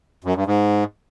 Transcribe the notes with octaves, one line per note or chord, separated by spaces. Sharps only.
F#2
G2
G#2